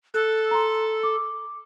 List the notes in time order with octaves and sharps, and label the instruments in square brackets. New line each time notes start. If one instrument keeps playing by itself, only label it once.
[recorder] A4 [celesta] F#6
[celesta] A#5 C6
D6